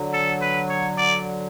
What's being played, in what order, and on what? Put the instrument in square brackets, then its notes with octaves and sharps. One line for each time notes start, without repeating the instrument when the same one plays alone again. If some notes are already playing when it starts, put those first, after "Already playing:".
Already playing: [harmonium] D3 F#3
[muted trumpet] A4
B4
C#5
D5